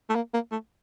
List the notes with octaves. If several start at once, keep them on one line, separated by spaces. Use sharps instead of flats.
A3
A#3
A#3
A3